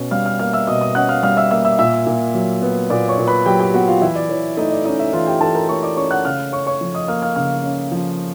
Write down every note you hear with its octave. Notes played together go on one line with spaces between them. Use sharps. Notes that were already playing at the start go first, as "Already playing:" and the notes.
Already playing: B2 C#4
G3 F5 F6
F5 F6
A#3 F5 F6
E5 E6
B2 D#5 D#6
D#5 D#6
C#4 F#5 F#6
F5 F6
G3 F5 F6
E5 E6
A#3 E5 E6
E5 E6
A#2 E5 E6
A#2
F#3
B3
A#2 D5 D6
C#5 C#6
A#2
B4 B5
F#3 G4 G5
G4 G5
B3 F#4 F#5
F4 F5
E3 E4 E5
D5
E3 C#5
A3 D#4 D#5
D5
C#4 D#4 D#5
E4 E5
E3 F4 F5
G4 G5
E3 A4 A5
A#4 A#5
A3 C#5 C#6
D5 D6
C#4 C#5 C#6
F#5 F#6
C#3 F5 F6
C#4 C#5 C#6
C#5 C#6
F3
D#5 D#6
A#3 F5 F6
F5 F6
C#3 F5 F6
C#4
F3